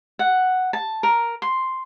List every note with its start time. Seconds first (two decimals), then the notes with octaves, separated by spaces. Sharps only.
0.19 F#5
0.73 A5
1.03 A#4
1.42 C6